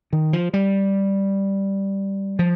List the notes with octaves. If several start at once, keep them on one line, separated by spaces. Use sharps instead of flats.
D#3
F3
G3
F3